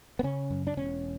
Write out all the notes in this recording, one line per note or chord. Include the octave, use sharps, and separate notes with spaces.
B3
C#3 C#4
F#2
D4
E1 C#4